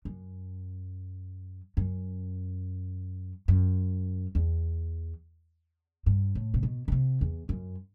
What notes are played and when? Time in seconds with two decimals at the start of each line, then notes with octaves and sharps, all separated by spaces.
0.05 F#2
1.77 F#2
3.48 F#2
4.35 E2
6.06 G2
6.35 A2
6.54 C3
6.63 B2
6.88 B2
6.92 C3
7.21 E2
7.49 F#2